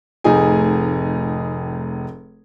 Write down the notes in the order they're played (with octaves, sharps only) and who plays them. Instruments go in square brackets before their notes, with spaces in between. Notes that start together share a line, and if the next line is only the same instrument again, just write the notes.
[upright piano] F1 A2 D#4 G#4 G#5